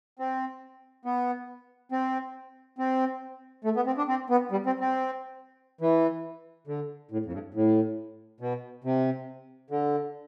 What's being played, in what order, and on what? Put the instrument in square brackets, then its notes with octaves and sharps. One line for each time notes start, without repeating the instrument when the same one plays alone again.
[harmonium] C4
B3
C4
C4
A3
B3
C4
D4
C4
B3
G3
C4
C4
E3
D3
A2
F2
G2
A2
B2
C3
D3